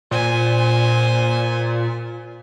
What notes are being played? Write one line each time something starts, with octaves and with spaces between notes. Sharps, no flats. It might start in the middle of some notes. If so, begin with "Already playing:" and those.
A#2 C5 G#5